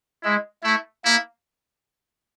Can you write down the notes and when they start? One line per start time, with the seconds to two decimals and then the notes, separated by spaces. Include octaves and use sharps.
0.23 G#3 E4
0.63 A3 E4
1.05 A#3 E4